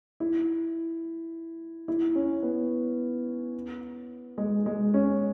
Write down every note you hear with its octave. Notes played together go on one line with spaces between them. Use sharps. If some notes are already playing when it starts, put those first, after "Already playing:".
E4
E4
C#4
B3
G#3
G#3
C#4